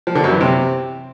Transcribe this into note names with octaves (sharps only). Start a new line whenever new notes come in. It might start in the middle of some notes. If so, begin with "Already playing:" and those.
F3
D3
F#2
E3
C3